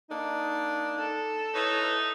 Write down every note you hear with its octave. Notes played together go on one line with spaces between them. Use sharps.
A#3 D4 D#4
A4
D#4 E4 B4 C#5